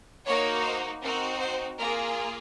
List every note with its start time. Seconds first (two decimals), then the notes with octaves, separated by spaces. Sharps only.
0.26 A#3 D#4 F#4 C#5
0.64 C5
1.02 C4 D#4 F#4 A#4
1.40 C5
1.78 A#3 F4 G#4 A#4